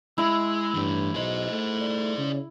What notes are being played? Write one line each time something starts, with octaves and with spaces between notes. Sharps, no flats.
G#3 E4 E6
G2 E3 A3
B1 G#4 C5 D#5
A3
D5
C#3